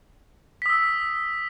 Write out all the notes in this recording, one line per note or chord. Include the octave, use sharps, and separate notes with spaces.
D#6 E6 B6